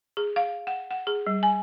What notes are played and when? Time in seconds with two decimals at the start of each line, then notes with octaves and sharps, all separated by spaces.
0.17 G#4
0.36 F5
0.67 F#5
0.91 F#5
1.07 G#4
1.27 G3
1.43 G#5